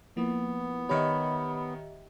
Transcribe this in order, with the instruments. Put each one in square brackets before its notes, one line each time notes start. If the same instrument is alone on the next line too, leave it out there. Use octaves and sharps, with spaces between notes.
[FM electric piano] F3 A#3 E4 [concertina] B3
[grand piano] D#3 C#5 [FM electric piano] G4 D#5 E5 [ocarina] B5